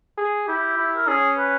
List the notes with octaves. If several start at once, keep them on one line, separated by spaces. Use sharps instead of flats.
G#4
E4 G4
E4
A#4
C#4 G#4
B4